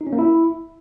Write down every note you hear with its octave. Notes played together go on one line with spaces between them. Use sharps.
D#4
C#4
A#3
E4